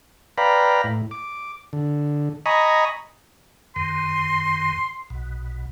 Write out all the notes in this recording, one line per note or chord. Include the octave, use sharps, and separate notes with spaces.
B4 D5 F5 G5 A#5 B5
A2
D6
D3
D#5 G#5 A#5 B5 C#6 D#6
F#2 D#3 C6
B1 B2